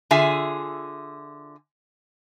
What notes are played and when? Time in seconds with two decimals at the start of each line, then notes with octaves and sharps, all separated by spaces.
0.11 D3 F4 G#4 E5 G#5